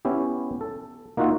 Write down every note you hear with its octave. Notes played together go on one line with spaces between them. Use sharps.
B3 C#4 E4 G4
A4
A#3 D#4 F4 F#4 E5